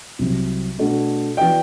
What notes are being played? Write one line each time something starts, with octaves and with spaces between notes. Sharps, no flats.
C2 C3 F#3
B2 A3 D4 F#4
E3 B3 F#4 B4 D5 G5